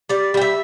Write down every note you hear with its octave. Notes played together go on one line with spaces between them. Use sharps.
G3 D5
G3 G5
E5